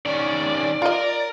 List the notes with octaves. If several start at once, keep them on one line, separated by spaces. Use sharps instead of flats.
D#3 C#4 D5
F4 A#4 D#5